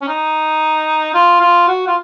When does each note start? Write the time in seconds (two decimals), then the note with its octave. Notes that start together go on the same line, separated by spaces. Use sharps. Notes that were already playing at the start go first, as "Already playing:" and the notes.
0.02 C#4
0.08 D#4
1.14 F4
1.41 F4
1.68 F#4
1.87 F4